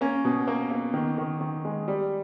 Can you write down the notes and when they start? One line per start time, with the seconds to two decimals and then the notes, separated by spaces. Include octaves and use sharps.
0.01 A#3 C#4
0.25 B2
0.48 A#3
0.71 A#3
0.94 D#3
1.18 D#3
1.41 D#3
1.65 G#3
1.88 G3